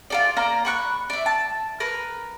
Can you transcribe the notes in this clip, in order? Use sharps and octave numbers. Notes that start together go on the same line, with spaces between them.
F4 A4 D5
A#3 D5 A#5
B5 C#6 F#6
D5 E5
A5
A#4 B4